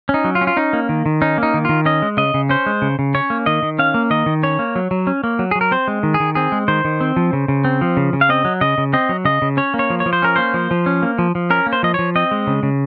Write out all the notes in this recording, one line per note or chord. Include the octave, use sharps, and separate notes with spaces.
C#4
D#4
F#3
F4
C#4
F4
C#4 D#4
A#3
D#3
D#3
C#4 D#4
A#3 D#4
D#3
D#3 F4
C#4 D#5
G#3
C#3 D#5
C#3
C#4 C5
G#3
C#3
C#3
C#4 C#5
A#3
D#3 D#5
D#3
C#4 F5
A#3
D#3 D#5
D#3
C#4 C#5
A#3
F#3
F#3
C#4
A#3
F#3
F#3 G#4
A#4
C4 C5
G#3
D#3
G#4
D#3
C4 G#4
G#3
D#3 C5
D#3
C4
F3
C#3
C#3
C4
F3
C#3
C#3
F5
C4 D#5
F#3
C#3 D#5
C#3
C4 D#5
F#3
C#3 D#5
C#3
C#4 C#5
A#3
C#5
F3
C#5
F3
C5
C#4 A#4
A#3 C5
F3
F3
C#4
A#3
F3
F3
C#4 A#4
A#3
C5
F3 D#5
F3 C#5
C4 D#5
G#3
C#3
C#3